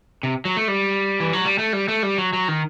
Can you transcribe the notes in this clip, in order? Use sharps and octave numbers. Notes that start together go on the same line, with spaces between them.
C3
F#3
A3
G3
E3
F#3
G3
A3
G3
A3
G3
F#3
F#3
D#3